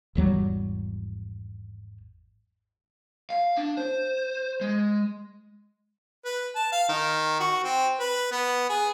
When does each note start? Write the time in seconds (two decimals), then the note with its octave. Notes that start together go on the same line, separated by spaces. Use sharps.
0.15 G#1 E2 F#3 G3
3.30 F5
3.57 D4
3.77 C5
4.61 G#3
6.25 B4
6.55 A5
6.72 F5
6.89 D#3
7.40 F#4
7.64 C4
7.99 B4
8.31 B3
8.69 G#4